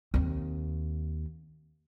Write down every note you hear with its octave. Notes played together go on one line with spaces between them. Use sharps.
D#2 C4